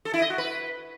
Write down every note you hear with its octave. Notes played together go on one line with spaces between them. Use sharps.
A4
E4
D#5
F#4
B4